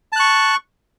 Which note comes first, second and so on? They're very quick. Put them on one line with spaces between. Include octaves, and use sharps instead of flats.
A5 F#6 C#6